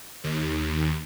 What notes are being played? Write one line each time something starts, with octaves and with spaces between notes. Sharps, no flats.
D#2